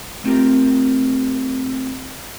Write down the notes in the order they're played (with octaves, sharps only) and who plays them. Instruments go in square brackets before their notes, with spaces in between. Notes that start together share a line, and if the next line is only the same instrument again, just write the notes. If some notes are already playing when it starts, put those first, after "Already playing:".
[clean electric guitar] A3 B3 C4 F4 G4 A#4